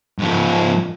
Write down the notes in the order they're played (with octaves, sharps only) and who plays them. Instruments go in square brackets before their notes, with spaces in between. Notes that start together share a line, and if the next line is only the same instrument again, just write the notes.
[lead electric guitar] G#2 F3